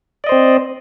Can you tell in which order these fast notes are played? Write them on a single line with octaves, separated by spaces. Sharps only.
D5 D#5 C5 C4